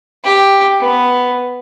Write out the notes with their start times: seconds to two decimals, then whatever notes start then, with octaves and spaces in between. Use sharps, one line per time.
0.24 G4
0.81 B3